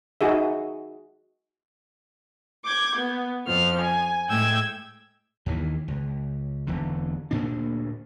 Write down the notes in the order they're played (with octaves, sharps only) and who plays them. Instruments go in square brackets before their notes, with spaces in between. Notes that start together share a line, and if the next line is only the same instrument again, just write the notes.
[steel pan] D#4 F#4 G#4 E5
[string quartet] D6 G6 G#6
B3
F2 F3 F6
G#5
A2 G#3 G5 E6 G#6
[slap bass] D#2 D#3 E3
C#2
E1 E2 D3
D2 A#2 A#3 D4